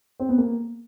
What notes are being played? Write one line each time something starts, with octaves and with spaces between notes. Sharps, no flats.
C4
B3
A#3